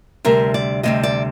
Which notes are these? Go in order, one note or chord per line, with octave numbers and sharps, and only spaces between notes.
D2 C3 G3 A#4
D5
D2 C3 G3 D#5
D5